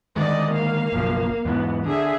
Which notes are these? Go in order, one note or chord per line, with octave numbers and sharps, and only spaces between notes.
D3 D#3 G#3 D5 D#5
A#3 F5
F#1 B1 F3
E2 G#2 E3 B3
D3 G#4 E5